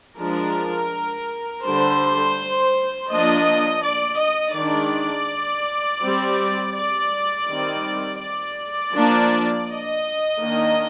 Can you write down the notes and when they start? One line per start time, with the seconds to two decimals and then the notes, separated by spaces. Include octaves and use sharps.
0.18 F3 G#3 D4 A#4
1.64 D3 G3 D4 C5
3.10 F3 A#3 D4 D#5
3.83 D5
4.20 D#5
4.56 D#3 G#3 D4 D5
6.02 G3 C4
6.75 D5
7.48 D#3 G3 C4
8.20 D5
8.94 F3 A#3 D4
9.67 D#5
10.40 D#3 A#3 D4